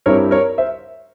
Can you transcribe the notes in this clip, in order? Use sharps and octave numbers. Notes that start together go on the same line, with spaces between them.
G2 G3 C4 E4 A#4 C#5
A#4 C#5
C5 E5